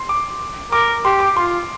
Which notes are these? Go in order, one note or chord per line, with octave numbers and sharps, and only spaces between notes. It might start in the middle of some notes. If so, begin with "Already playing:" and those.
Already playing: C6
D6
A#4 D6
G4 C6
D6
F4 C6